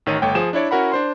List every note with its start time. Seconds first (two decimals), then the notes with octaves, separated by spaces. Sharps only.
0.06 A1 D#3 C#5 D#7
0.22 G1 A3 C#5 G5
0.35 F3 G#4 E7
0.53 D4 E4 C#5 D5
0.71 C#4 E4 F#4 A#4 F#5 B5
0.92 D4 C5 C6